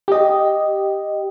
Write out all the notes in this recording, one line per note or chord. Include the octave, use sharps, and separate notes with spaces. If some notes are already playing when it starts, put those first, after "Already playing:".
G4 D#5